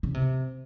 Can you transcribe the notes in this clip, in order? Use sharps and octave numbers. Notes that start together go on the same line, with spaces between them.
C#3
C3